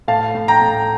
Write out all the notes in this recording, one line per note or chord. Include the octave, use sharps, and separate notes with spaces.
A2 F5 A5
A2
G5 A#5
A2